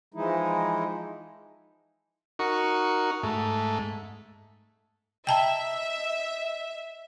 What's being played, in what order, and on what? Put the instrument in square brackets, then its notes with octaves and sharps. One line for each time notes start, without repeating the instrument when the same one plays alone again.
[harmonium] E3 F3 G#3 D#4 E4
[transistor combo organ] D#4 F#4 A#4 C#6
G#2 A3
[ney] D#5 [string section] E5 [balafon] G5 A5 A#5